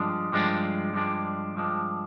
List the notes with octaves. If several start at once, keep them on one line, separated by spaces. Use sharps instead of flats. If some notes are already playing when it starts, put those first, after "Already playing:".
Already playing: G2 F3 G#3 D4
G2 F3 G#3 D4
G2 F3 G#3 D4
G2 F3 G#3 D4